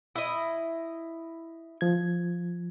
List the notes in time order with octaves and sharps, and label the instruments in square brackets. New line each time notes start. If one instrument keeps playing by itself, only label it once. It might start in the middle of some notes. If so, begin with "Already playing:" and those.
[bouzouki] E4 D#5
[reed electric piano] F3 G#6